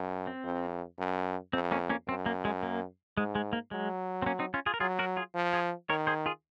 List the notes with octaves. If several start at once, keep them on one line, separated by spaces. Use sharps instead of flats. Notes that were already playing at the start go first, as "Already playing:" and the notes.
Already playing: F#2
C4
F2
F#2
F2 C4
A#3 C#4
A#3 C#4
F#2 C4
A#3
G#3
A#3
G#2 G#3
G#3
A#3
F#3 G#3
C4
A#3 C#4
C4 D#4
C#4 F4
F4 G#4
A#4
F#3 F4 G#4
F#4 A#4
F4 G#4
F3
F4 G#4
D#3 A#4 C#5
G#4 C5
F4 G#4